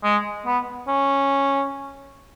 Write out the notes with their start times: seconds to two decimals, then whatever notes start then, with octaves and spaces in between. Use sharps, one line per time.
0.04 G#3
0.46 B3
0.88 C#4